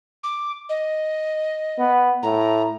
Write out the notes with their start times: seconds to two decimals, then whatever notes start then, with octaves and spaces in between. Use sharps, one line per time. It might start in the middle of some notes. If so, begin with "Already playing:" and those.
0.24 D6
0.69 D#5
1.79 B3
2.23 A2 A#5